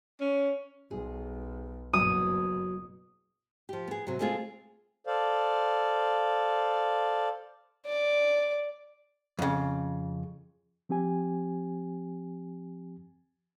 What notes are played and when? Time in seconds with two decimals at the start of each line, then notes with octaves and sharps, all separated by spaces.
0.20 C#4
0.91 B1 G#4
1.93 F#1 B2 F#3 D#6
3.69 F3 G4
3.88 B3 G#4
4.07 C3 F#3
4.19 G#3 A3 C4 F4 G#4
5.07 A4 C5 D5 F5
7.86 D5
9.39 F2 C#3
10.89 F3 C4 G4 G#5